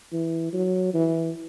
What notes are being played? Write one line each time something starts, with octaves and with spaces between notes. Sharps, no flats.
E3
F#3
E3